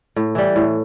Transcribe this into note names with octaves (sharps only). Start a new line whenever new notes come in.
A2
E3 G3
A2